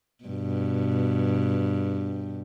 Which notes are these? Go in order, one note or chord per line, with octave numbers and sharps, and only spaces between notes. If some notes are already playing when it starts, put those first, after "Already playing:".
G2 B2